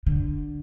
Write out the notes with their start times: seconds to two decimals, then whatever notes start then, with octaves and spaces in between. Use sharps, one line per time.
0.06 D3